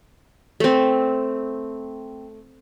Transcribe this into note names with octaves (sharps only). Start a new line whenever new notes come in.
A3 C4